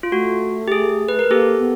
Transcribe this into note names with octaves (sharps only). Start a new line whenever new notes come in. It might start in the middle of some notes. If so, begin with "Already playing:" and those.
F4
A3 F#4
G4
G#4
B4
A#4
A#3 G4 A4
B3